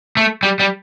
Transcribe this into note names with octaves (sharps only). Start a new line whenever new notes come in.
A3
G3
G3